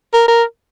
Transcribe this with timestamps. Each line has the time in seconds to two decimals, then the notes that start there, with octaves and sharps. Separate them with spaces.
0.13 A#4
0.28 A#4